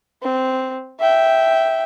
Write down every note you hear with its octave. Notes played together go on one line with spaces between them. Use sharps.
C4
E5 G5